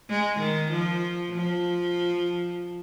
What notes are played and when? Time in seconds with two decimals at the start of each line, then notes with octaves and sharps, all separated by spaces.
0.10 G#3
0.41 D#3
0.73 F3
1.35 F3